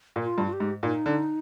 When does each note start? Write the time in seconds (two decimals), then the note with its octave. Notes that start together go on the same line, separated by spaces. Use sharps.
0.16 A#2
0.23 F4
0.38 G2
0.47 F4
0.53 G4
0.60 G#2
0.83 A#2 D#4
1.06 D3